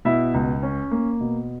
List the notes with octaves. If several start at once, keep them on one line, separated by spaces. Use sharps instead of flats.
B2 E4 E5
C#2
C#4
A#3
B2